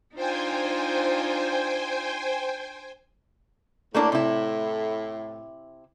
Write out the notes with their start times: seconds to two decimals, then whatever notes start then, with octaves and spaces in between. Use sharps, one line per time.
0.15 D4 D#4 F4 C5 G5 G#5
3.94 A2 A3 A#3 D4
4.12 C3 E4